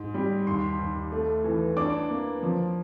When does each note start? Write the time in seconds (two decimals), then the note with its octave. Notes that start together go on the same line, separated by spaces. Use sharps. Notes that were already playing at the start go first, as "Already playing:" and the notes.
Already playing: G#2
0.14 G3
0.46 D#2 C6
0.79 D#2
1.12 A3
1.44 E3
1.77 D4 D6
2.10 A#3
2.43 F3